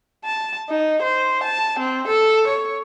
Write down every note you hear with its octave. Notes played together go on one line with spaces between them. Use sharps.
A5
D#4
C5
A5
C4
A4
C#5